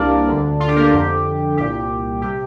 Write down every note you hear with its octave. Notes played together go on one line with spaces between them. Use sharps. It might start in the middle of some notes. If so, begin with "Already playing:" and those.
Already playing: C2 C3 A#3 D4 A#4 D5
D2 D3
F4
G4
A#3 A#4
F4
F2 D3 G4
C2 A#2 G4
C3 G4